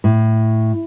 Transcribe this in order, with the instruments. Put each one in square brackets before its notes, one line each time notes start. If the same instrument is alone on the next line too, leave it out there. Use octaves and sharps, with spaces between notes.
[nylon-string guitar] A2